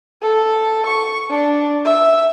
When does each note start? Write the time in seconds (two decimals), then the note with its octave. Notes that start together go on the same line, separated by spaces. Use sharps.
0.23 A4
0.86 C#6
1.30 D4
1.85 E5